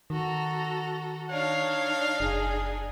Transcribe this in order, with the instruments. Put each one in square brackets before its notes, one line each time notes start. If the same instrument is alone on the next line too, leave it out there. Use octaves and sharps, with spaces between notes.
[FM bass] D#3 [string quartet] F#4 A4 A#5
[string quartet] D4 D#4 [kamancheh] C#5 [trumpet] F5
[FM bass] F#1 [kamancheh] G#4